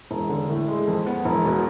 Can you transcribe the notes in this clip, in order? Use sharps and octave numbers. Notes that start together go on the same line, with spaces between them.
E1
D3
A2
G#3
F2
B3
E1
B2